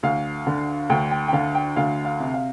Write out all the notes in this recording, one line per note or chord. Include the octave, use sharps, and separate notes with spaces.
D2 F5
D3
D2 G5
G5
G5
D3 F5
G5
D2 F5
F5
C3
F5